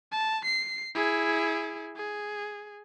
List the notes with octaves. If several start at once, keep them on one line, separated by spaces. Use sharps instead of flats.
A5
C7
E4 G#4
G#4